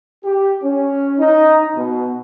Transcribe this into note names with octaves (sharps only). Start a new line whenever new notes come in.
G4
C#4
D#4
B2